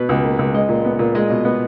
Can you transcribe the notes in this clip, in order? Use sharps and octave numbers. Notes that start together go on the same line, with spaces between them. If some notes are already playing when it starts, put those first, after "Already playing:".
Already playing: B2 B4
C#2
A#3
C#2
G#3 D#5
A#2
B3
A#2
G#3 D#5
B2
B3